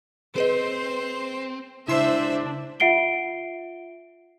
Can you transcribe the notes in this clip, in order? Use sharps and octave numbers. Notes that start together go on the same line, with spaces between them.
C4 G#4 B4 C5 D#5
C#2 D4 E4 C5 E5 C6 C7
F4 E5 F#5 C7 D7 G7